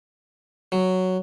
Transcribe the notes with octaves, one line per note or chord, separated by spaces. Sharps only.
F#3